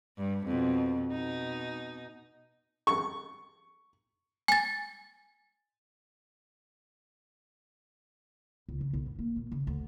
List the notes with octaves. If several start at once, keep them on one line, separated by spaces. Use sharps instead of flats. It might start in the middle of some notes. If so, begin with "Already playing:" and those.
G2
F2 B2
B2 D#4
C#6
G#5 A6
C#2
C#3
B1
F#2
A#3
A#2
C#3
D2